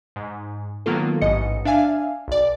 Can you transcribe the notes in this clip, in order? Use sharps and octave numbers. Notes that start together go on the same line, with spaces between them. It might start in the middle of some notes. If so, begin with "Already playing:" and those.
G#2
D#3 F#3 A#3 B3 F4 A4
A1 G#2 D#5 C#7
D4 E5 F5 G#5
B1 D5